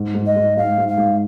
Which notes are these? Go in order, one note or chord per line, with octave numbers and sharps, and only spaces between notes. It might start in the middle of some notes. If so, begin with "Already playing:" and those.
Already playing: G#2
G#2
D#5
G#2
G#2 F5
G#2
F5
G#2